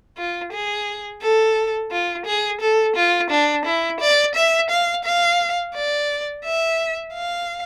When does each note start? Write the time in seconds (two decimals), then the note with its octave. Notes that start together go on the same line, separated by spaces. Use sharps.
0.18 F4
0.53 G#4
1.22 A4
1.91 F4
2.26 G#4
2.61 A4
2.96 F4
3.31 D4
3.66 E4
4.00 D5
4.35 E5
4.70 F5
5.04 F5
5.74 D5
6.45 E5
7.14 F5